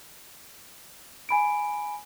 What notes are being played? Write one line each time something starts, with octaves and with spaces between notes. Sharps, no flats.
G#5 B5 D7